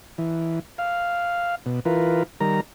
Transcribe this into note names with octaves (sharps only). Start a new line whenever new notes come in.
E3
F5
B2
E3 F4 A#4 B4
D#3 G3 A#4 A#5